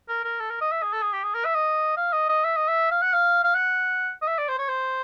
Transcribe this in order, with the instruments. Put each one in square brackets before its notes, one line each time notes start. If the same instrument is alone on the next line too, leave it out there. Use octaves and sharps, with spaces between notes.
[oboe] A#4
A#4
A4
A#4
D#5
E5
G#4
A4
G#4
G4
G#4
A#4
E5
D#5
F5
D#5
D#5
E5
D#5
E5
F5
F#5
F5
F5
F#5
D#5
E5
D5
C5
C#5
C5